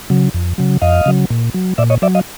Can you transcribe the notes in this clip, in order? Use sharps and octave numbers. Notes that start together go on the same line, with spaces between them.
C#3 F#3
F2
C#3 F#3
F2 D#5 F5
C#3 F#3
A#2
F#3
A#2 D5 E5
C#5 D#5
F#3 D5 E5
D#5 F5